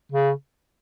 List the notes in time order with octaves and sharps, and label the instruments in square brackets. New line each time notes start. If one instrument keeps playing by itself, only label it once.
[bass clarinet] C#3